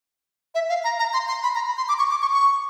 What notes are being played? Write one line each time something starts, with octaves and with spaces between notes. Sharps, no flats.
E5
F5
A#5
A#5
C6
C6
B5
A#5
B5
C6
D6
C#6
D6
C#6
C#6